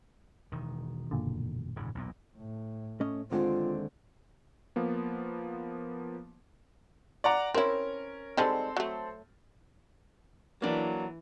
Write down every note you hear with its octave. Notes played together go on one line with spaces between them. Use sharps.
E1 D#3
F#1 A#2 D3
D#1 G#2 C#3
B1 E2 A#2
A2
A3 C#4 D#5
D#2 D3 G#3 C4 F4
F3 A#3 B3
D5 F#5 A#5
C4 C#4 E4 A#4
D#3 G3 G#3 C4 A4
F#3 A3
E3 F#3 A#3 D4